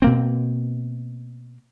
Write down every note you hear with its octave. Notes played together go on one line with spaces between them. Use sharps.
B2 A#3 C4